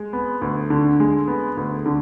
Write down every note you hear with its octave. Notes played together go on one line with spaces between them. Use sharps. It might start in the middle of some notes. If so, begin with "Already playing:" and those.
Already playing: G#3
B3
D2
D3
G#3
B3
D2
D3